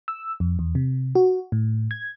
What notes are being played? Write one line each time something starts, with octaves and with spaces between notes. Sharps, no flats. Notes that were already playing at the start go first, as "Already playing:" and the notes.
E6
F2
E2
C3
F#4
A2
G#6